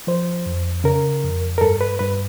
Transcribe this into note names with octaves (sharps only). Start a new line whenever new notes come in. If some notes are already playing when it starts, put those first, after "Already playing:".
F3 C5
F2
C#3 A#4
F2
A#4
G2 A4
B4
G2 B4